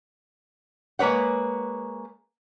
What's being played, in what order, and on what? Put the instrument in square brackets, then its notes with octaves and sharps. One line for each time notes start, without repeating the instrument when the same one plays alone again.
[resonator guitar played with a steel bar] G#3 A#3 B4 C#5 F#5